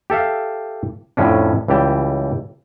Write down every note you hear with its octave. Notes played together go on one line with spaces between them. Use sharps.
G4 A4 E5 F5
F2 A2 C#4 D4
C#2 E3 G3 G4 A5